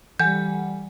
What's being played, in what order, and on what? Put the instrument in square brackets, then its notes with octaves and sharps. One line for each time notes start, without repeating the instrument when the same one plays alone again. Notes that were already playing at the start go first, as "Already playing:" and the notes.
[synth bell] E3 F#5 G#5 [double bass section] G3 [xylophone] G6